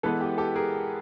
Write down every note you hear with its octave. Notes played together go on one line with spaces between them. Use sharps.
E3 G#3 B3 A4 B4
G4
G4 A4
G#4 A#4